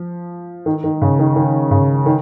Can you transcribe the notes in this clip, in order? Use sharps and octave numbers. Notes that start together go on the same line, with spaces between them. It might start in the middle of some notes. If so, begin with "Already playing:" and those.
Already playing: F3
D#3
D#3
C#3
D#3
D#3
C#3
D#3